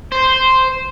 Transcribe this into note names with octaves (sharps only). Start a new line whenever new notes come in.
C5